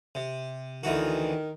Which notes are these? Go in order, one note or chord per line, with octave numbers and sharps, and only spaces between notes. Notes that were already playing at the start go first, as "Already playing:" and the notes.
C3
D2 D#3 E3 F#4